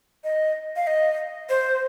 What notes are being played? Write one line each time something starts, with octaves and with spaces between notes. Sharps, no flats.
D#5
F5
D#5
C5